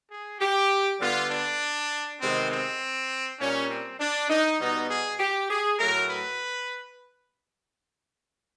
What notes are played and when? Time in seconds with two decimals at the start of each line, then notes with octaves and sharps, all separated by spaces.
0.11 G#4
0.40 G4
1.00 D3 G3 B3 F4
1.30 D4
2.21 C3 D#3 G#3 B3 C4
2.51 C4
3.40 A#2 G3 A#3 C#4
3.70 C4
4.00 D4
4.29 D#4
4.59 B2 G3 B3 D#4
4.89 G#4
5.20 G4
5.50 G#4
5.79 A2 F#3 A3 A#4
6.09 B4